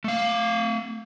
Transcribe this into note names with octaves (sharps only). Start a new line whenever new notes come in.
A3 F5